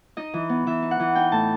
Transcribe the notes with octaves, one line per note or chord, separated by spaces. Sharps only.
D#4 D#5
E3
B3
E3 E5
D#4
F#5
E3
D#4 G5
A2 A5